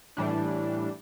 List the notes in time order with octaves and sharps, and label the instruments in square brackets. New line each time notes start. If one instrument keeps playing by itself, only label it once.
[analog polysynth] A2 E3 G3 D4